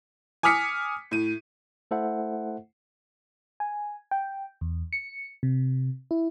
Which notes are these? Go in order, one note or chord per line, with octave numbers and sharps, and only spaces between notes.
G#5 D6 D#6 F6 B6 C#7
A2 D#7
A3 E4 A4 C5 E5 F#5
G#5
G5
E2
C#7
C3
E4